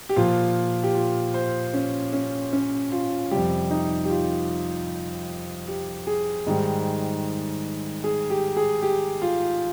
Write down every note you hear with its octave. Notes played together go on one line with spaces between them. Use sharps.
G4
A#2 F3 F4
G4
F4
C5
C#4
C#4
C#4
F4
F2 C3 G3 G4
D#4
G4
F4
G4
G#4
G#2 D#3 G3
G#4
G4
G#4
G4
F4